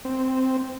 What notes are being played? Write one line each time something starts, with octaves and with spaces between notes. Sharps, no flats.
C4